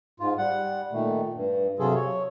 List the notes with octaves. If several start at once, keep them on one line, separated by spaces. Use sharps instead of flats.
G#2 F4
G3 F#5
A#2 D#3 A3
G2
C3 F#3 F4 G#4 A4
C#5